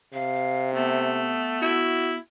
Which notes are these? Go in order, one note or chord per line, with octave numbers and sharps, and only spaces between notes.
C3 F5
A3 B3
E4 F#4